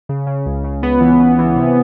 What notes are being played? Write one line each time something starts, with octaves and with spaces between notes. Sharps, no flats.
C#3
C#3
C#2
C#3
C#2 B3
E3
C#3
E3
C3